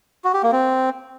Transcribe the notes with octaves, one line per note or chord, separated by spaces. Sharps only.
F#4
G4
A#3
C4